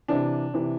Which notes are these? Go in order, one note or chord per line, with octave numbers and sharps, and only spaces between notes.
C3 E3 D4
C3 E3